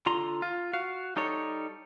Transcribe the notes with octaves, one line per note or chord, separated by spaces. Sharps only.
D3 F4 A#5 C6
F4
F#4 F5
G3 D#4 A4 C#5